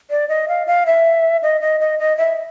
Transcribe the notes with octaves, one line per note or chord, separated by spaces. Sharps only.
D5
D#5
F5
F5
E5
D#5
D#5
D#5
D#5
E5